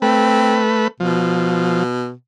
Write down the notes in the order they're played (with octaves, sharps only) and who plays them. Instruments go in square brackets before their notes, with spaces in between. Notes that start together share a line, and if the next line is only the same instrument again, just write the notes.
[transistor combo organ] A3 B4 [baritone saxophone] C4
[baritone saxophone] B2 [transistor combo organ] F3